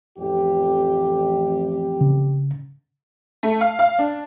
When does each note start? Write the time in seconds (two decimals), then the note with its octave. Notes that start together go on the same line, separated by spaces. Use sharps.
0.18 A1 F2 G4
2.01 C#3
3.43 A3
3.61 F5
3.79 F5
3.99 D4